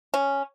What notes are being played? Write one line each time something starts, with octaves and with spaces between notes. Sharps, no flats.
C#4